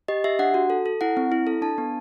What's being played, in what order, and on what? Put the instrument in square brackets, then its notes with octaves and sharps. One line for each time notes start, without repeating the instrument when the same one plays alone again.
[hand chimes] G4 D#5
G4 E5
D4 F#5
F#4
A4
A4
E4 F#5
C4
E4
A4
D4 A5
B3